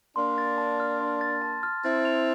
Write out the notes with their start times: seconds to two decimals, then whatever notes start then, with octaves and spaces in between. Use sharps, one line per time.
0.16 A#3 D4 C6
0.38 A6
0.58 A5
0.80 F6
1.01 C6
1.21 A6
1.42 A5
1.63 F6
1.84 C4 E4 A6
2.05 F7